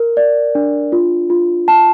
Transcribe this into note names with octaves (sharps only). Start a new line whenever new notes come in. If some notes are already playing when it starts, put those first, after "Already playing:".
Already playing: A#4
D5
D4
F4
F4
A5